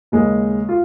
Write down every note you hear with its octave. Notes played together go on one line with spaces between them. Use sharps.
D#2 C#3 G#3
F4